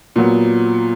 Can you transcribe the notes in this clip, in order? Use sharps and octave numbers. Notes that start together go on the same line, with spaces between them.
A#2 F#3 B3